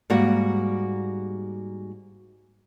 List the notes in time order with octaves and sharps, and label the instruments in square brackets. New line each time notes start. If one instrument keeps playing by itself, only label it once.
[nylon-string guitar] G#2 G3 A#3 F#4 F#5